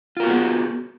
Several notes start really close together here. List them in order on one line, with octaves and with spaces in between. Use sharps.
F4 A#4 F#4 B3 G#4